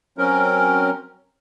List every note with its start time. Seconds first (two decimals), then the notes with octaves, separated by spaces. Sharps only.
0.18 F#3 C4 C#4 A#4